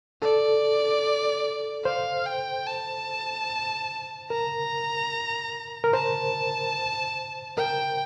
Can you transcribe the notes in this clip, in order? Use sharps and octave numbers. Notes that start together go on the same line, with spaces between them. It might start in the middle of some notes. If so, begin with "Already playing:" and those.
A4 D5
C5 F5
G5
A5
A#4 A#5
A#4
C5 A5
A#4 G5